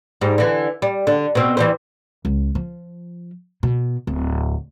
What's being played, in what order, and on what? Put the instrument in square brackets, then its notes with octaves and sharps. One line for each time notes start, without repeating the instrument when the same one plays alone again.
[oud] G#2 G3
D3 E3
G3
D3
B2 C4
E3 G3 C5
[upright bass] C#2
F3
B2
D1